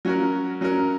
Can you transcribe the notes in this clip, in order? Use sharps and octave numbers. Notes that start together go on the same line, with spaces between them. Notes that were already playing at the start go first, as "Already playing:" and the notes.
F#3 C#4 F#4 A#4
F#3 C#4 F#4 A#4